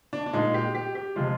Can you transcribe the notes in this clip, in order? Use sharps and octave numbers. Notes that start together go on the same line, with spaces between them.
D4
D4
A#2 G#3 D#4
G4
G4
G4
C3 F3 G#3 F4